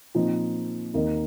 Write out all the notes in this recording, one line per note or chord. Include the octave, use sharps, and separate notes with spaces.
A#2 F3 C4 D#4
D#2 D#3 A#3 D#4